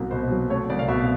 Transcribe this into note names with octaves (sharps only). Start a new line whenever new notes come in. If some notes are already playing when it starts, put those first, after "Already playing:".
Already playing: C2 B2 F#3 A#3
B2 C5
F#3
A3 C#5
C2 D5
F5
B2 E5